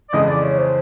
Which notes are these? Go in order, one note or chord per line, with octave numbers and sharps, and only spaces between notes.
D5
F2 C#3 E3 G#3 D#5
D5
C#5
C5